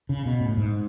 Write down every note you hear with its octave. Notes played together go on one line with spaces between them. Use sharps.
C#3
B2
A2
G#2